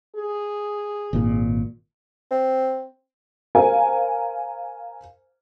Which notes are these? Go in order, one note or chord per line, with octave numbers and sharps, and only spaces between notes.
G#4
G#1 A#2
C4
A#4 C5 F5 G#5